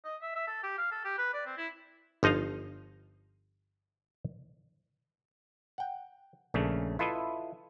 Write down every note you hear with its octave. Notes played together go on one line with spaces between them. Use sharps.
D#5
E5
E5
A4
G4
F5
A4
G4
B4
D5
C4
E4
G1 F3 D#4 D#5 F5
F#5 G5
A#1 C#3 A3 C#4 D4
E4 F4 A4 B4 D#5 E5